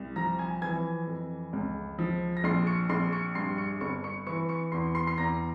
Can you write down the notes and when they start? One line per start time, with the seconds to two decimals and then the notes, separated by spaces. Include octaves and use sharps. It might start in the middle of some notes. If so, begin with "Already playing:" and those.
Already playing: C2
0.16 F3 A#5 A#6
0.39 G#5 G#6
0.62 E3 G#5 G#6
1.07 F2
1.53 C#2
1.99 F3
2.37 A#6
2.44 A#1 C6 C7
2.67 C#6 C#7
2.89 A#1 C6 C7
3.13 C#6 C#7
3.35 G2 C6 C7
3.58 C#6 C#7
3.81 G1 C#6 C#7
4.04 C#6 C#7
4.27 E3 C#6 C#7
4.49 C#6 C#7
4.72 E2 C6 C7
4.95 C6 C7
5.07 C7
5.18 E2 A#5 A#6